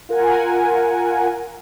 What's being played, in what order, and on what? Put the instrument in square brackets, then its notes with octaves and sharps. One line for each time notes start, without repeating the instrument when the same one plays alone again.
[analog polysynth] F4 A#4 F#5 G#5